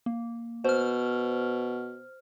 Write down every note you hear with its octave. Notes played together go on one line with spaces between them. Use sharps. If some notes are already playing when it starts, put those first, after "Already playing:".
A#3
B2 C5 F6